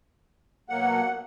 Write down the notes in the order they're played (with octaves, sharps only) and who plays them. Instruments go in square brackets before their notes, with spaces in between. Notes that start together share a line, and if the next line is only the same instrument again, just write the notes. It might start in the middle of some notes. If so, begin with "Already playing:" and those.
[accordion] B2 F#3 A#3 F#5